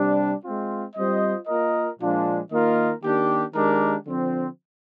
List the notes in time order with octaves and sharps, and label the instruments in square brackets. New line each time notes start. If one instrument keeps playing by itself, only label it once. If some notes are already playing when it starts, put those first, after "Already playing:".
Already playing: [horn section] C3 G3 D4
G#3 C4 F4
G3 C4 F4 C5 D#5
A#3 F4 A#4 D#5
A#2 F3 G#3 D4 F4
D#3 A#3 F4 A#4 D#5
D#3 A#3 D4 G4
D#3 G#3 D4 G4 A#4
D3 F3 C4